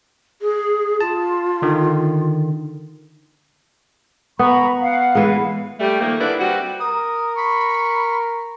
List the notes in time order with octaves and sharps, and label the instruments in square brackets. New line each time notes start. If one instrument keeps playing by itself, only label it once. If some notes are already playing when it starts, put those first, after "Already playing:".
[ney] G#4
[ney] F4 [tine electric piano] A5
[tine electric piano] D3 D#3
[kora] B3 [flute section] A#5 B5 C#6
[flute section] F5 F#5
[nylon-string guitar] E3 G#3
[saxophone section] G3 A3
D#3 F3 A3 A#3
D3 A#3 D4 E4 B4
G3 C4 F#4
[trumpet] A#4 [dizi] D#6
[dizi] B5 [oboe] C#6